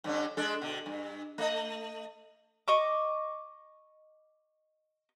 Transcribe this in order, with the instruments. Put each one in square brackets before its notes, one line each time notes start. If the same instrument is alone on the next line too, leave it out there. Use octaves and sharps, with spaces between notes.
[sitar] G2 D3 C#4
G#3 D4 A4
B2 D3
G2
A3 D#5
[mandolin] D#5 C#6 D6